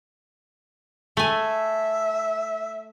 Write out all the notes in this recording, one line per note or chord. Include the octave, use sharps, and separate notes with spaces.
A3 E5 G#5